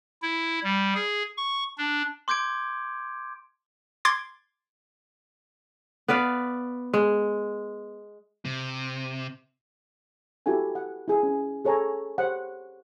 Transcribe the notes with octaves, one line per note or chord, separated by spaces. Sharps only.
E4
G3
G#4
C#6
D4
C6 D6 G6 G#6 D7
C6 D6 G#6 A6
B3 B4 D5 F5
G#3
C3
E4 F#4 G4 A4 G#5
F#5
E4 G#4
C#4
G#4 A4 C#5 G#5 A#5
G4 C5 C#5 F#5